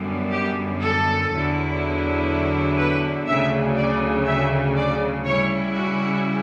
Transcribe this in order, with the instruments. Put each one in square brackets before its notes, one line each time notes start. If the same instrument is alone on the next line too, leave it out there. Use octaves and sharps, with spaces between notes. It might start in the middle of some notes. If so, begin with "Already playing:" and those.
Already playing: [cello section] F#2 D3 G3 B3
G4
A4
E2 D3 F#3 B3 E4
B4
D2 C#3 F#3 E5
D5
E5
D5
C#3 G3 C#4 E4 C#5
F#4